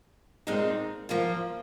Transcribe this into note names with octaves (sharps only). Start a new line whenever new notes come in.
A#2 G#3 C4 D#4 A#4
F3 A#3 F4